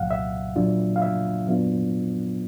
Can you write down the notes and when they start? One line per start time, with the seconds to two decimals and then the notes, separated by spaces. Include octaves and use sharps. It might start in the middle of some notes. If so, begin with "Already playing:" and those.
Already playing: C2 A#2 F#3 F5 F#5
0.11 E5
0.56 A#2 F#3 A#3 D4 F4
0.96 F5
1.02 E5
1.46 A#2 F#3 B3 D4 F4